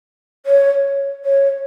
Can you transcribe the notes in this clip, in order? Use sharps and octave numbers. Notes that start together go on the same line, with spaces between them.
C#5
C#5